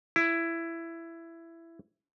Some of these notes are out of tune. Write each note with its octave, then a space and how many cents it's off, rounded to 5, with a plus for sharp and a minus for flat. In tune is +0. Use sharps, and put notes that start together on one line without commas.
E4 +15